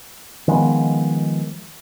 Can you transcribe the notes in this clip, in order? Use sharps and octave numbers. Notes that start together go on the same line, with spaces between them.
D#3 F3 G#3 B3